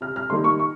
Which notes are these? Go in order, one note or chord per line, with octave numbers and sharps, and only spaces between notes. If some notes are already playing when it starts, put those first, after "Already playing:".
C3 F6
F6
D#3 G3 A#3 D#4 C6
C#6
C#6